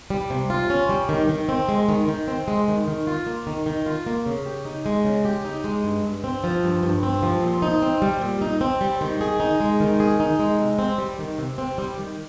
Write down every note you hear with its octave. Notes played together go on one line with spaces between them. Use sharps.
G3
C3
F4
C#4
G3
D#3
D#3
C4
G#3
D#3
D#3
C4
G#3
D#3
D#3
F4
A#3
D#3
D#3
F4
A#3
C#3
G4
D#4
G#3
C#3
G4
D#4
G#3
G2
G2
C4
F3
G2
G2
C4
F3
A#2
D#4
C4
G3
A#2
D#4
C4
G3
D#3
G#4
D#4
G#3
D#3
G#4
D#4
G#3
C3
C4
G3
D#3
C3
C4
G3
D#3